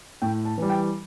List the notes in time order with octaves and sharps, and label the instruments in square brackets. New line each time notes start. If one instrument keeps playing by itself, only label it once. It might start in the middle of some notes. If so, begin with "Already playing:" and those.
[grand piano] A2 G5
A5
E3 G3
G5